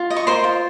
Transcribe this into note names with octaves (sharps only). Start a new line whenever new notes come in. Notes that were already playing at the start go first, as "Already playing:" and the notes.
Already playing: F4
D#5
C#6
A#4 C5 C6
F4